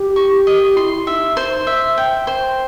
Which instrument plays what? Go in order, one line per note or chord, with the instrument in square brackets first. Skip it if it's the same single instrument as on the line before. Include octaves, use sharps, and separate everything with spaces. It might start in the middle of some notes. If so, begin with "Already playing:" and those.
Already playing: [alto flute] G4
[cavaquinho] C#6
D#5
[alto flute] E4 [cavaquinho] C6
[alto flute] D#4 [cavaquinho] E5
[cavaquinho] C5
E5
G5
C5